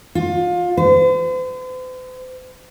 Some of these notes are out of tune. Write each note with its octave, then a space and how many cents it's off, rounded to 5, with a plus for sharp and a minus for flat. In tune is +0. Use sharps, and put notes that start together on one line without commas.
F4 +25
C5 -45